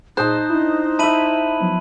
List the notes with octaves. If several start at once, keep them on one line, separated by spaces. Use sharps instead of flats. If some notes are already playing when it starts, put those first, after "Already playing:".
A#2 D#4 G#4 C5 D#5 A5 F#6
D4 E4
E4 E5 A5 B6 D#7 F#7
F3 F#3 B3